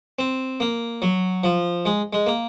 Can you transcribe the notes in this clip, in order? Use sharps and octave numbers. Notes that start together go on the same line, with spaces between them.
C4
A#3
F#3
F3
G#3
G#3
A#3